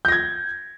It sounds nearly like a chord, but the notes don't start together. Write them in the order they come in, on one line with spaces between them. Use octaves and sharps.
G6 A#6 G#6